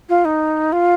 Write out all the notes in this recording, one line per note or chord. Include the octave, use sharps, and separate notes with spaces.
F4
D#4
F4